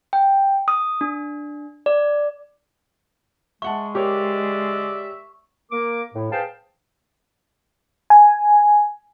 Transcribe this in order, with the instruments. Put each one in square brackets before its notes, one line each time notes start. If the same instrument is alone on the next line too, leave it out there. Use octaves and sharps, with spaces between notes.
[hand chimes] G5
D#6
D4
D5
[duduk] G#3 [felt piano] E5 F#5 A5 [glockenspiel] C#6
[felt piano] G4 A#4 C#5 [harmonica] D5 E5
[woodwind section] A#3 A#4 D6
A2
G#4 B4 C5 F5 G5 A5
[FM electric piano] G#5